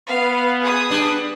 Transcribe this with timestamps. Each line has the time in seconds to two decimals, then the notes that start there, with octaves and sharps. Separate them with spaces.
0.10 B3 F5
0.61 G#4 B4 D#6
0.91 G3 D4